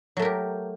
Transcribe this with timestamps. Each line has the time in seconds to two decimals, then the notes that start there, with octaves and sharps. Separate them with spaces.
0.17 F#3
0.19 A3
0.22 A#4
0.25 G4